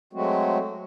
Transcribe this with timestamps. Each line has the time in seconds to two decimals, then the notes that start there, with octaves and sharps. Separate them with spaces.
0.13 F#3 G#3 A3 C4 F#4